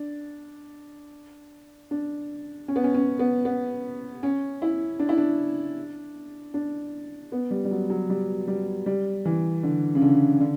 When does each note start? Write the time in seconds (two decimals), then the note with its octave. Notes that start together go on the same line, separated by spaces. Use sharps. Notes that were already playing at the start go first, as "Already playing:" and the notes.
Already playing: D4
1.91 D4
2.68 C#4
2.76 B3
2.84 C#4
2.94 C#4
3.19 B3
3.45 B3
4.23 C#4
4.62 E4
4.99 D4
5.09 E4
5.18 D4
6.54 D4
7.32 B3
7.51 G3
7.65 G3
7.71 F#3
7.90 F#3
8.10 G3
8.48 G3
8.86 G3
9.25 E3
9.63 D3
9.95 C#3
10.02 D3
10.40 D3